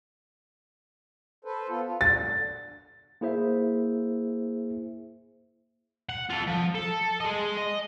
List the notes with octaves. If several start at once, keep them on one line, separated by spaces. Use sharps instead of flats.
A4 B4 C5
B3 F4 A4
F4
D3 A6
A#3 E4 G#4 C5 E5
F#5
F4 A4
F3
A4
G#3 D#5
D#5